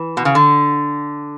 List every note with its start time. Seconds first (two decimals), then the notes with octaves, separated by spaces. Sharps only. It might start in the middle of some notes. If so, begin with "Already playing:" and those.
Already playing: E3
0.17 B2
0.25 C#3
0.35 D3